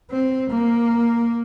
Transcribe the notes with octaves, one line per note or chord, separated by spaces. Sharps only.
C4
A#3